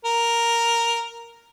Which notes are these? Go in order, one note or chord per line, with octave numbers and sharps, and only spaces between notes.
A#4